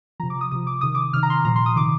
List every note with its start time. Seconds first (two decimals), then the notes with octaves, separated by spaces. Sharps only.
0.20 F3 A#5
0.23 C3
0.30 D6
0.41 D#6
0.51 C3 F3 D#6
0.67 D6
0.81 C3 D#3 D#6
0.95 D6
1.13 C3 D#3 F6
1.23 A#5
1.30 C6
1.45 A#2 F3 A#5
1.56 C6
1.66 D#6
1.76 C3 D#3 D6